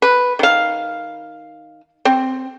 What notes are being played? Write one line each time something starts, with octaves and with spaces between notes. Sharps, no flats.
B4
D#3 F5
C4